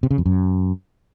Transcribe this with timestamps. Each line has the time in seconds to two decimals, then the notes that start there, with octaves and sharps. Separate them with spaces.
0.03 C3
0.11 C#3
0.18 F2
0.26 F#2